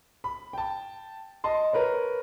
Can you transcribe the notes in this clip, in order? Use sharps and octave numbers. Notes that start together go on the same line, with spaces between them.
B5
G5 A5
D#5 A5 C6
A#4 B4 C#5